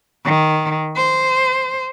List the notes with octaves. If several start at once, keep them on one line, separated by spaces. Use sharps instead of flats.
D#3
C5